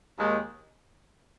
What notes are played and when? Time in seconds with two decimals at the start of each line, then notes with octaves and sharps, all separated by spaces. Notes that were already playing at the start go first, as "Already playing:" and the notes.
0.17 D#2 D#3 G#3